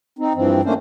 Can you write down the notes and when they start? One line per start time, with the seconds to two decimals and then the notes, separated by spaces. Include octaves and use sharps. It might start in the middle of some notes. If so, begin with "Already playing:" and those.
0.19 C4 D#4
0.35 G2 E3 F3 C4
0.64 D#3 A3 A#3 C#4 D4 C5